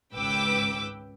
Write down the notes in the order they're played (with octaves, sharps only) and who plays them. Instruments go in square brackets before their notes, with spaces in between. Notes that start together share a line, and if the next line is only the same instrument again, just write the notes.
[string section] G#1 C#2 B4 G5 D6 E6